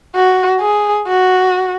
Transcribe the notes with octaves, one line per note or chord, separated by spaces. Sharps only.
F#4
G#4
F#4